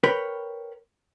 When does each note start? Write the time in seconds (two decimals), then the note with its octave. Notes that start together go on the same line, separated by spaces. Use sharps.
0.03 A#4 B4 C#5 G5 B5